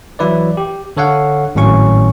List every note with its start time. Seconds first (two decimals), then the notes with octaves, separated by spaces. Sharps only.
0.19 E3 F#3 E4 B4 D5
0.57 G4
0.97 D3 A4 C#5 F5 F#5
1.55 G#1 A2 F#3 C#4 C#6